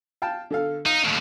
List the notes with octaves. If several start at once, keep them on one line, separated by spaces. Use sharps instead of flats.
F5 G5 A5
D3 A4 F5
D#4 F5
D#2 A2